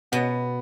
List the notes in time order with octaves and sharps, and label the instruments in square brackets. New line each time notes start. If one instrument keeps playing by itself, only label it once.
[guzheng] B2 [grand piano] B3